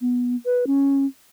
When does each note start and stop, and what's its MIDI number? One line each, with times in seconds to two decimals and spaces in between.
0.01 0.35 59
0.45 0.65 71
0.67 1.06 61